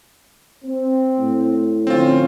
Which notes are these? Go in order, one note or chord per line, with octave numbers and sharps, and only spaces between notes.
C4
A2
D3 F3 C4 C#4 F4